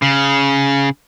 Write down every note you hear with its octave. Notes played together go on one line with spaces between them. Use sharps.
C#3